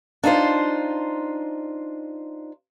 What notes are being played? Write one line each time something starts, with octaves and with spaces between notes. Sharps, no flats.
D4 D#4 F4 C5